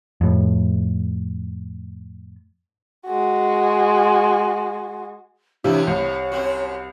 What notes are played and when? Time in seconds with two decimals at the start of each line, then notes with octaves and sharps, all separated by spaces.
0.21 F2 A2
3.07 G#3 F#4
5.64 A2 C3 E3 A#3 D4 E4
5.87 C2 C#5
6.32 F#2 C4 F#4